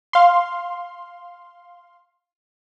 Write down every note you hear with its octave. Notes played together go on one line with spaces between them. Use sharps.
F5 C6